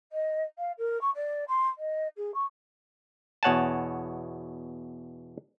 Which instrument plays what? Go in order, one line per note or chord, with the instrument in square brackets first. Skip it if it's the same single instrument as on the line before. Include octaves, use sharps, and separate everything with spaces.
[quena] D#5
F5
A#4
C#6
D5
C6
D#5
G#4
C#6
[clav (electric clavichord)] E2 B2 C#5 F#5 G#5 A5